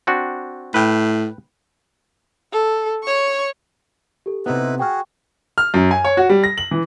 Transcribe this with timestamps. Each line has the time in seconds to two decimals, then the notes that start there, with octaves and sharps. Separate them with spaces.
0.07 C4 D4 F#4
0.74 A2 B4 G5
2.53 A4
3.03 C#5 C#6
4.26 G4 A4
4.46 C3 B3 D#4 E4 B4
4.79 F#4 G#4 G5 C#6 F6
5.58 F6
5.74 F#2
5.91 G#5
6.04 C#5
6.17 F#4
6.29 G3
6.44 A#6
6.58 F#7
6.71 E3